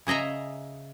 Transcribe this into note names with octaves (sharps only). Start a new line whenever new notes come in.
C#3 G#4 D#5 E5 A#5